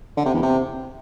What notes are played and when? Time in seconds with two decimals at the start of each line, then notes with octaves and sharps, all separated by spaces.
0.17 D3
0.25 C3
0.34 E2
0.42 C3